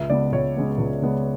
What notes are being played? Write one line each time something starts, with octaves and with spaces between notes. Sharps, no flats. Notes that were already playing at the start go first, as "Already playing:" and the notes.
Already playing: C#2 E5
C#3 G#3 B3 D5
C#2 C#5
C#3 G#3 B3
C#2
C#3 G#3 B3